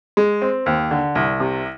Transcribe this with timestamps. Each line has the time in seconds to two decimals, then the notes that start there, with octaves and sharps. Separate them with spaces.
0.17 G#3
0.42 C4
0.66 D#2
0.91 D3
1.15 C2
1.40 C3